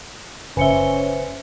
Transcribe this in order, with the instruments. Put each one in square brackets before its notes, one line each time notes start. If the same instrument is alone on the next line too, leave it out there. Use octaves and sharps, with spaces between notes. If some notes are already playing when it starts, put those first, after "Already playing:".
[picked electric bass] F#1 [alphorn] C#4 [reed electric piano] B4 C5 E5 [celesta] G#5 C#7 G7